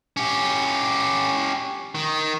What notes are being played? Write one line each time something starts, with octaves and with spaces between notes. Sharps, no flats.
C#4 G4
D#3